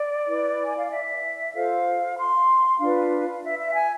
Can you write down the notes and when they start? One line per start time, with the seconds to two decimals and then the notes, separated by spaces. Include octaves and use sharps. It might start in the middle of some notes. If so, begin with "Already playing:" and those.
Already playing: D5
0.28 E4 B4
0.63 G#5
0.77 F5
0.91 E5
1.54 F4 A4 C5 F5
2.17 C6
2.80 D4 F4 B4 F5
3.42 E5
3.58 E5
3.74 G#5